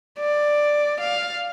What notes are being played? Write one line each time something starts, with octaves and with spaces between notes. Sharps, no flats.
D5
F5